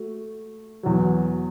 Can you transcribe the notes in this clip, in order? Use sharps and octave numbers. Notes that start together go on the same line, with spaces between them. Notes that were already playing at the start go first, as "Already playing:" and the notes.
Already playing: A3 F#4
E2 B2 F#3